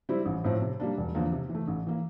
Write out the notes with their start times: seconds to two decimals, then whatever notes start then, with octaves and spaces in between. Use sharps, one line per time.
0.09 G3 C4 E4
0.25 A1
0.44 A2 F3 C4
0.61 C3
0.80 G3 A#3 D4
0.97 E1
1.15 E2 D3 F3 A#3
1.32 C3
1.49 E3
1.55 A3
1.68 A1
1.87 E3 A#3